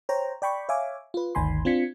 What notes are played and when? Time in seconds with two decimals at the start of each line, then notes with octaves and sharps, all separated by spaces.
0.09 C5 C#5 G5 A#5
0.42 D5 G5 B5 C#6
0.69 C#5 E5 F5 G#5 D6
1.14 F4 B4
1.35 G1 D2 D#3 G#5 B5 C6
1.65 C4 D4 F4 G#6 B6 C#7